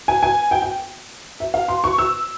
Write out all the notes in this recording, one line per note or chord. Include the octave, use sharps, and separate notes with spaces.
G#5
G#5
G5
G5
E5
F5
C6
C#6
E6